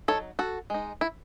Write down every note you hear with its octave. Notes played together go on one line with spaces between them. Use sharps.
F#3 B3 D#4 A4 C#5
F#4 A4
G#3 D#4
E4